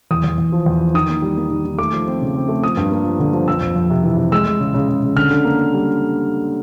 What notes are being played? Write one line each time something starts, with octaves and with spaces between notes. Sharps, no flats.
E2 D#6
E2
E2
F3
E2
F3
D#3 D#6
A#3
G3
A#3
D#3
D#3
A3 D6
F3
C4
C#3
C4
A3
F3 D#6
G2
A#3
F3
D3
F3
F2 E6
F2
F2
C3
E3
C3
G#3 E6
G#3
C#3
C#3
C#3
C#3
D3 F6
D3
A#3
A#3
G3